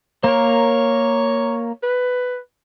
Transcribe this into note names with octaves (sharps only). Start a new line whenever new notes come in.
A#3 A#4 C#5
B4